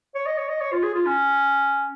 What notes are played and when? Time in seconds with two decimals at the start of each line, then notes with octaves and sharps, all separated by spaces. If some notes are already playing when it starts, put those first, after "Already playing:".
0.15 C#5
0.26 D#5
0.38 C#5
0.49 D#5
0.61 C#5
0.72 F4
0.83 G#4
0.94 F4
1.06 C#4